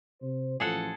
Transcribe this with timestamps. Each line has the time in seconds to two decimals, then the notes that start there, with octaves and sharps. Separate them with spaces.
0.22 C3 C5
0.60 A1 F3 G#4 A4 F#5